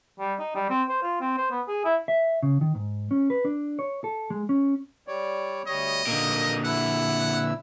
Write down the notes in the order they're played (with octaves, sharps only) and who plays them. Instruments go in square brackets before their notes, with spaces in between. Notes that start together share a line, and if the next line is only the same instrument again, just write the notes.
[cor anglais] G3
D#4
G3
C4
C5
F4
C4
C5
B3
G#4
E4
[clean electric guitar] E5
C#3
D#3
G#2
C#4
B4
D4
C#5
A4
G#3
C#4
[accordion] G3 C#5 D5
[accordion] D2 G3 C#5 [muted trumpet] D#5
[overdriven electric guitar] A#2 D3 [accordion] A#3 D#4 A#4
[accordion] E4 E6 [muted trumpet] F#5